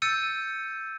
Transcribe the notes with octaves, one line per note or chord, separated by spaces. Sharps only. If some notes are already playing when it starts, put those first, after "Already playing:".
E6 G6 A6 C#7 D#7